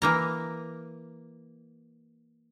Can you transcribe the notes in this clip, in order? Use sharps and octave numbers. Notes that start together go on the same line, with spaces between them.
E3 A#3 A#5